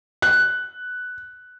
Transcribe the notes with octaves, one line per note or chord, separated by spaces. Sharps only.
F#6